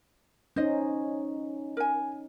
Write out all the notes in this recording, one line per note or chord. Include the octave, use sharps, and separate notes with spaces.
C#4 D#4 C5 D#5
A#4 G#5